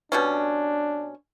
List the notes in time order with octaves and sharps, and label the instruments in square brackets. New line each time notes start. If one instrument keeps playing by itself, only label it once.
[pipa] B2 G3 C#4 [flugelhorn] D4